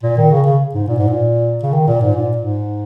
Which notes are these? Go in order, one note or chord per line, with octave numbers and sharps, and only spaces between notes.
A#2
D#3
C#3
C#3
G#2
A#2
G#2
A#2
C#3
D#3
A#2
G#2
A#2
G#2